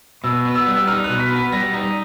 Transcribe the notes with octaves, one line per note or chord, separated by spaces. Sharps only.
B2 E6
B3
E6
G3
E6
D#4 F6
F#6
B2
B6
B3
B6
G3 A#6
D#4